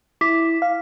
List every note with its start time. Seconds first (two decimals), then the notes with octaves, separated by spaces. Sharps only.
0.21 E4 D6 B6
0.62 F5